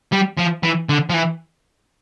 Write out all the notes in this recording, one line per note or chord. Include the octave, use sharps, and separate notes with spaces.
G3
F3
E3
D3
F3
E3